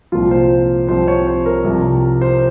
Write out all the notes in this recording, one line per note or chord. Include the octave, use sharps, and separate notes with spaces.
C2 A#2 F3 F4
C5
C2 C3 F3 C5
C#5
C5
A#4
C2 C3 F3
C5